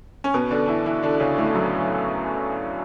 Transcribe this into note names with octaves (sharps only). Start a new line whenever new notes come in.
C#4
B2 B3
D3 D4
E3 E4
E3 E4
D3 D4
C#3 C#4
A2 A3
F#2 F#3